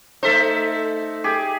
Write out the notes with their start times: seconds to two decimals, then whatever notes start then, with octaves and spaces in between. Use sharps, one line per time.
0.23 A3 D#4 A4 C5 E5
1.24 G4 G#4